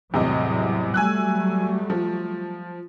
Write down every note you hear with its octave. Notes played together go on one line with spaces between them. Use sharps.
E2 A2 C3 F#3 G3 D#5
F#3 G3 A3 G#5 E6 F#6
F3